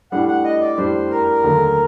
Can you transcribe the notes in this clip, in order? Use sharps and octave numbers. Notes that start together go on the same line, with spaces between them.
A2 G3 D4 F#5
F#5
D#5
D5
A2 G3 D4 C5
A#4
D#2 D3 F#3 A3